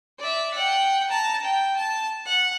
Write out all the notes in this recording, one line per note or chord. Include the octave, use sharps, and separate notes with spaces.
D5 E5
F#5 G5
A5 A#5
G5
A5
F#5